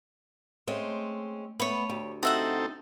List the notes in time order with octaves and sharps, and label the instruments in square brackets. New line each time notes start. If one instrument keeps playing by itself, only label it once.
[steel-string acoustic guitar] G#3 C4 C#4 [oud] A3
[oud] A3 [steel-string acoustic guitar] B3 [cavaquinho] C#5 B5
[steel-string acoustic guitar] D2 [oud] G4
[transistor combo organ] C4 D#4 A4 [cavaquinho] F#4 E5 F#5